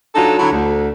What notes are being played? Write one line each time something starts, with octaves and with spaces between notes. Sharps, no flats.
F#3 D4 D#4 F4 A4
D3 F#3 E4
D2